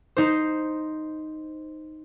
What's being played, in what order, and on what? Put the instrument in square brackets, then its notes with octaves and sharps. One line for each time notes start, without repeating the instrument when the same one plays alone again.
[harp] D#4 C5